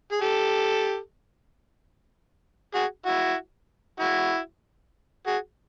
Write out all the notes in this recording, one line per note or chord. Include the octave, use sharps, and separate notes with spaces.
G#4
G4 A4
F#4 G#4
E4 F#4
E4 F#4
F#4 G#4